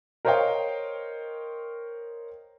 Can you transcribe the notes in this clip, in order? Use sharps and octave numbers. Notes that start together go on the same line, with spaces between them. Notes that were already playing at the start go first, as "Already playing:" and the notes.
A#4 C5 C#5 D#5 F5 G5